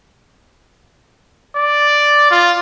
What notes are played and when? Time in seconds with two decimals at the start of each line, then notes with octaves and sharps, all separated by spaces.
1.57 D5
2.31 F4